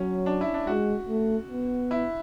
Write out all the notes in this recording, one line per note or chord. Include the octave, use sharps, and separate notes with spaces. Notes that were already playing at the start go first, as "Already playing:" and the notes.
Already playing: F#3 C#4
D4
E4
D4
G#3 F#4
A3
B3
E4